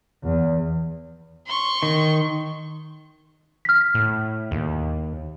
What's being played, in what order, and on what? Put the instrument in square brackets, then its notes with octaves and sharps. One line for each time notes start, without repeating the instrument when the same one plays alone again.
[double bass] E2
[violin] C6 C#6
[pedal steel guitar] D#3
[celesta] F6 B6
[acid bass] A2
D#2